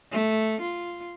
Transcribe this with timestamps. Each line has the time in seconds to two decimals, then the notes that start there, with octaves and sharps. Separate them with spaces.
0.12 A3
0.61 F4